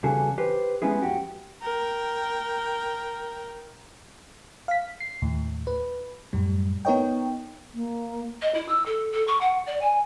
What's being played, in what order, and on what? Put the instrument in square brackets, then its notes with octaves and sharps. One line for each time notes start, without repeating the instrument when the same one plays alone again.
[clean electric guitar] E2 C#3 G3 F#4 G#4 A4
G4 B4 C5
G#3 B3 C#4 E4 G#4
F2 F#4 G4
[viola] A#4 G5
[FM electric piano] F5 B6
C7
D#2 A2
B4
F#2 A2 G3
B3 D#4 A#4 C#5 D#5 G5
[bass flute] A#3
[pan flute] D#5
E4
E6
A4
A4
C#6
F#5
D5
G#5